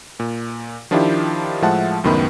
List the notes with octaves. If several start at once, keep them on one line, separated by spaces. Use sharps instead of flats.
A#2
D#3 F3 D4 E4 F4 G4
A2 F3 G#3 E5 F#5 A5
C#2 F#2 A2 D#3 B3 B5